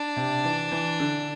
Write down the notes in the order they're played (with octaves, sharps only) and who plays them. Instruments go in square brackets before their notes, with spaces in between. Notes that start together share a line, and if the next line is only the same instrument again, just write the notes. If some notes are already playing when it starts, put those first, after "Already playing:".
Already playing: [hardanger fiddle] D4
[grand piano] C3
E3
E3
D3